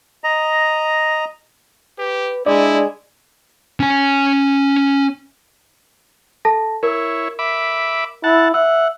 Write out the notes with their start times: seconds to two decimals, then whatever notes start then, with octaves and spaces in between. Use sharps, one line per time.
0.24 D#5 A#5
1.99 G4 B4
2.46 G#3 D4 E4 D5
3.80 C#4 G#5
6.45 A4 A5 A#6
6.83 E4 A#4 C#5
7.39 E5 B5 D6
8.24 E4 F#5 A5
8.54 E5 F#5 E6